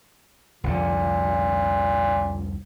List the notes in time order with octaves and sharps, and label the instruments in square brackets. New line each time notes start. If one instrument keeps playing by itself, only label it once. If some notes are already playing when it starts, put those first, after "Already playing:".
[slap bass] C2 F2 D3 [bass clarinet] A#2